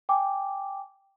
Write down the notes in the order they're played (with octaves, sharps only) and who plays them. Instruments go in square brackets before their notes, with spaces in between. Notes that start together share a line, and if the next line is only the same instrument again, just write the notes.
[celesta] G5 G#5 D6